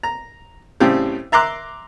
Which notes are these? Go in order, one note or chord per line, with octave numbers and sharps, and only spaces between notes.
A#5
A2 C#3 G3 C4 G4
E5 A#5 C6 D6 F#6